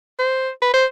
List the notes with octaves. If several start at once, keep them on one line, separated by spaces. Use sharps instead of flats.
C5
B4
C5